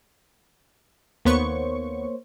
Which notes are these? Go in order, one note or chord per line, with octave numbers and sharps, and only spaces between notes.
D#2 A#3 B3 C5 C#5 C#6